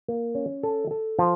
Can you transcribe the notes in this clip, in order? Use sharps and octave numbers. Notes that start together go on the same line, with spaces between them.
A#3
C#4
A4
A4
F3